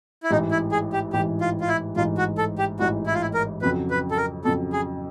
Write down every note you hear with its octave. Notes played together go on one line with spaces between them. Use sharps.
E4
A1 G#2 E3 D#4
E4
G#4
G4
A1 G#2 E3 G4
F4
F4
E4
A1 G#2 E3 F4
F#4
A4
G4
A1 G#2 E3 F#4
E4
F4
E4
A#4
F2 C#3 F#3 B4
B4
A4
A#4
F2 C#3 F#3 A4
G#4